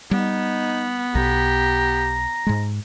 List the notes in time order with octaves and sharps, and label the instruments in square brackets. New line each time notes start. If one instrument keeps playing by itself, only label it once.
[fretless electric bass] G3 [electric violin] B3 [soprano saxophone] D#4
[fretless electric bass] B1 [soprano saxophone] G4 [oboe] A#5
[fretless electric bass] G#2 G#3